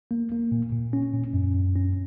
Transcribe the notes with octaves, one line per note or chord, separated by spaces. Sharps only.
A#3
A#3
A#2
A#2
C#4
A#2
F#2
F#2
C#4